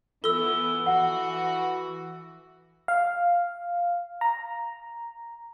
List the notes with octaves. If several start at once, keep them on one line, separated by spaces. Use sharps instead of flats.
E3 B3 E4 F4 A4 E6 G7
E3 F#4 F#5 A5
F5
A#5